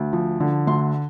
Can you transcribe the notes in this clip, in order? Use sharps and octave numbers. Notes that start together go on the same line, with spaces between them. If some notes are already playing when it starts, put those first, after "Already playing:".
Already playing: D2
F3
D3
D2 C6